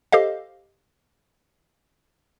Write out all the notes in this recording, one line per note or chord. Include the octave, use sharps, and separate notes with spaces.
G4 A4 C5 D#5 F5